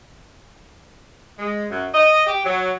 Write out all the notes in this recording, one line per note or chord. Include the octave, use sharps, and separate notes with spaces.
G#3
F#2
D#5
G4
F#3